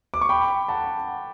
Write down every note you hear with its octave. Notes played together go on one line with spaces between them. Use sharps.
D6
C#6
G5 B5
F#5 A5